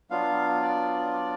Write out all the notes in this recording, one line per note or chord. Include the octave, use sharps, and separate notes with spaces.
F#3 B3 D4 F4 F5
D5
D5